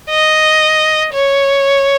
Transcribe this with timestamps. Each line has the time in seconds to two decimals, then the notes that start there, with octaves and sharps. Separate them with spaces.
0.10 D#5
1.13 C#5